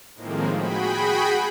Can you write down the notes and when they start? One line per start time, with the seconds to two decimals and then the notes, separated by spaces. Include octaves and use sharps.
0.15 A2 D#3 F3 G#3 A#3 C4
0.53 F#4 G#4 G5 B5